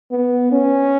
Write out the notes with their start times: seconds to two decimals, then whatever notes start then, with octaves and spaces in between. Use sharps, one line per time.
0.11 B3
0.52 C#4